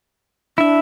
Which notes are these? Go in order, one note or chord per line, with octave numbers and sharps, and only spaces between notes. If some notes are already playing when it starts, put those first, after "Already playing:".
D4 E4 E5